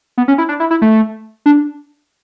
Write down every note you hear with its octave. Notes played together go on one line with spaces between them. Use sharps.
B3
C#4
E4
D4
E4
E4
A3
D4